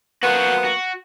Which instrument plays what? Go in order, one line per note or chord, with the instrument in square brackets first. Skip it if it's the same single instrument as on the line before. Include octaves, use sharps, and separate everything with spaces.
[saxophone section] F#3 A#3 B3 [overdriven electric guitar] F#4 C5
[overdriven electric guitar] F#4